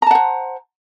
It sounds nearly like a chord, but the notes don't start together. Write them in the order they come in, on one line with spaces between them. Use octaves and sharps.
A#5 A5 F#5 C5